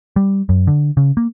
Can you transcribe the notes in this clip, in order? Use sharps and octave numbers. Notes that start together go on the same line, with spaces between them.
G3
F#2
D3
C#3
A#3